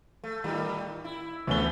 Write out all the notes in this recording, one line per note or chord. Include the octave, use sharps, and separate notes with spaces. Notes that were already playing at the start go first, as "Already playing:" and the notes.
A3
A2 D#3 G3
E4
D2 E3 A3 B3 C#4 G7